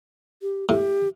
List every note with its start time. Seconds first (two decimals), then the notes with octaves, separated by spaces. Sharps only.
0.42 G4
0.69 A2 G4